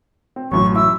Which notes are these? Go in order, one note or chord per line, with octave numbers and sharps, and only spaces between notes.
C4
A1 F#2 E3 F#3 C#6
E4 E6